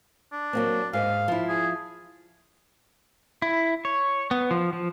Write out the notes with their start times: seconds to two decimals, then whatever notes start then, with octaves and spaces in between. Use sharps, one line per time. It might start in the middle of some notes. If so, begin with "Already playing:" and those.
0.32 D4
0.53 F#3 A#3 C4
0.93 G#2 A4 D#5 F5
1.28 F3 E4
1.48 G#4
3.42 E4
3.85 C#5
4.31 B3
4.51 F3
4.73 F3